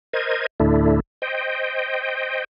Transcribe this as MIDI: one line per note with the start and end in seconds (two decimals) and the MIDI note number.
0.13 0.46 70
0.13 0.46 72
0.13 0.46 75
0.13 0.46 92
0.60 1.00 38
0.60 1.00 45
0.60 1.00 50
0.60 1.00 57
0.60 1.00 62
0.60 1.00 64
1.22 2.44 72
1.22 2.44 75
1.22 2.44 79